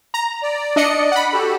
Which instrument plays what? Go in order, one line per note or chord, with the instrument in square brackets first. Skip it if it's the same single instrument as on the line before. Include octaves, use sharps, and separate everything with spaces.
[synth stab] A#5
[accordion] D5
[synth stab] D4 D#5 C#7
F#5 B5
[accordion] F#4 G4 A4